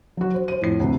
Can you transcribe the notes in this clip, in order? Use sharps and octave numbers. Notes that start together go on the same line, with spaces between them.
F#3 F#4
C5
C5 D#7
F2 A2 C7
D2 C3